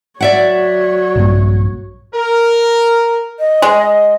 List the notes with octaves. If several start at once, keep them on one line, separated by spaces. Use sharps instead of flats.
F#3 C#5 D5 E5 F#5
A#1 G2 A#2
A#4
D#5
G#3